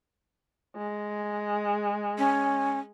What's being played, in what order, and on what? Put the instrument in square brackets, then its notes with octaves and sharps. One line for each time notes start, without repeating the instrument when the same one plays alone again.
[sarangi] G#3
[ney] C#4